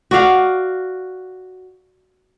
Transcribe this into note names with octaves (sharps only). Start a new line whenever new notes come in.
F#4 D5 F5